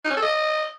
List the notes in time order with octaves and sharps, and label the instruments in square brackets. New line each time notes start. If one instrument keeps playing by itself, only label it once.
[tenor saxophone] D#4
C#4
A4
D#5